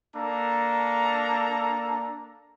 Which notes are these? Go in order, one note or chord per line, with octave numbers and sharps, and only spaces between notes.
A#3 D4 A4 A#5